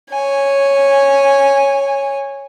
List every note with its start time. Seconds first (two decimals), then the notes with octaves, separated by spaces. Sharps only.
0.10 C#5 G#5